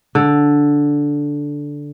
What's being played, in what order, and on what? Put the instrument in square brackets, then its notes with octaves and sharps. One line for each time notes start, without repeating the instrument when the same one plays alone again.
[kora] D3